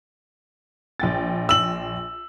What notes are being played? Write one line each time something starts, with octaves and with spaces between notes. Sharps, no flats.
A#1 G5 A6
E6 F#7